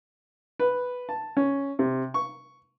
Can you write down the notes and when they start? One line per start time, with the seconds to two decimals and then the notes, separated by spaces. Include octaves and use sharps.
0.59 B4
1.09 A5
1.37 C#4
1.79 C3
2.14 C#6